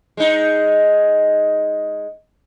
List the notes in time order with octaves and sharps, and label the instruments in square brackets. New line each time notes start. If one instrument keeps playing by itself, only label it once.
[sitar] G#3 D#4